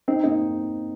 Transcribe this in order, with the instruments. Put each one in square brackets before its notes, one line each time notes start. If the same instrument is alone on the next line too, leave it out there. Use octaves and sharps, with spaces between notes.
[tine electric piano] C4 [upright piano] D#4
[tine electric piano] A#3 [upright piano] D#4